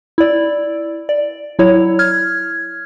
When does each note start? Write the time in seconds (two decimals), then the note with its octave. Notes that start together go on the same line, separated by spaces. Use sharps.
0.18 E4 D5
1.09 D5
1.59 F#3 E4 C#5
1.99 F6 G#6